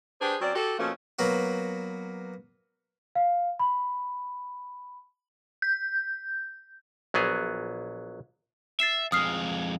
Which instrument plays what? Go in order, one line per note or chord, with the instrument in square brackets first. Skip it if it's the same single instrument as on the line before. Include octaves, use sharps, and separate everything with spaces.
[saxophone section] D4 G4 G#4 B4 C5
F#3 C4 C#4 D5
F#4 G4 A4
B2 F3 A3 A#3 C#4
[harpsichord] F#3 A#3 B3 F#4
[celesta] F5
B5
[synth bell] G6
[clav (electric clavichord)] A#1 F#3 B3 G#4
[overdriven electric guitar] E5 [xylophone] A6 C7 E7
[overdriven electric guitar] F2 G#3 [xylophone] D#6 F6 C7